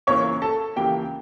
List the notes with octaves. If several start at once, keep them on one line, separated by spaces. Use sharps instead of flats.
C#2 C#3 E3 A#3 C#5 C#6
A4 A5
C#2 C#3 E3 A#3 G4 G5